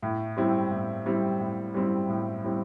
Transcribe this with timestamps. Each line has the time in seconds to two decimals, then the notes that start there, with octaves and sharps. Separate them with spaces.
0.03 A2
0.37 G3 C4 E4
0.71 A2
1.06 G3 C4 E4
1.40 A2
1.74 G3 C4 E4
2.09 A2
2.43 G3 C4 E4